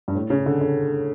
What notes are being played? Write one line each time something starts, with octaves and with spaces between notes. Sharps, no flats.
G2
A2
C#3
D3
D3